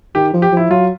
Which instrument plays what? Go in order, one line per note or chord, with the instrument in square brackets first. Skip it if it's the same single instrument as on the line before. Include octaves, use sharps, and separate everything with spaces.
[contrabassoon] D#3 [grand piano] G4
[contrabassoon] F3
[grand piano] G4
[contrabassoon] F3
[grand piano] E4
[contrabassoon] F#3 [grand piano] F4